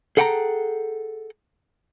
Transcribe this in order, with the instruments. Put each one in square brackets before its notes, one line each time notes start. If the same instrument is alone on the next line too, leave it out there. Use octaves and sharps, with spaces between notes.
[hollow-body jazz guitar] G#4 A4 F#5 G5 A5 A#5